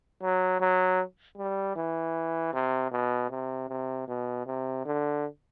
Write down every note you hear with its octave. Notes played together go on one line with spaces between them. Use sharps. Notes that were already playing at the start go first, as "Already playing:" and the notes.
F#3
F#3
G3
E3
C3
B2
C3
C3
B2
C3
D3